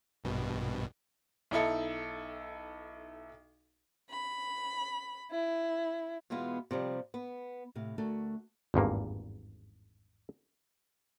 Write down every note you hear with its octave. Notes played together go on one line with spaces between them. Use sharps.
A#1 G2 B2
B1 D#4 E4 A4
B5
E4
B2 E3 G#3 B3 F4
C3 F3 G3
B3
A2 C3 F5
D2 A3 F#4 A4 A#4
G#1 E2 G2 A#3